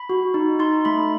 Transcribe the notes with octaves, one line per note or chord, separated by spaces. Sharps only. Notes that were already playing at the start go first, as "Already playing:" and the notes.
Already playing: B5
F#4
D#4
D#4 C6
A3 B5